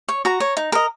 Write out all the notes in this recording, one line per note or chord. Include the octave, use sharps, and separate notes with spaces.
C#5
F#4 A#5
C#5
D#4
A#4 D#5